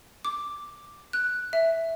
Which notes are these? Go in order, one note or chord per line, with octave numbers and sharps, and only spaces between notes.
D6
F#6
E5